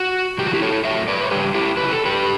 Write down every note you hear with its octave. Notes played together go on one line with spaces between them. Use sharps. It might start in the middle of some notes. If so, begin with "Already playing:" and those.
Already playing: F#4
C#3 E3 G3 G4
F#4
E4 G4
A4 C#5
A2 F#3 C#5 E5
B4 D5
C#5
C#3 E3 G3 G4 B4
E4 G4
C#3 F#3 B4
A4
G4 B4